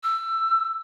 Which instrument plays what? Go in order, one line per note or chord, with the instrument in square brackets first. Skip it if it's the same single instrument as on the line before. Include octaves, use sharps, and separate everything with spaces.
[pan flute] E6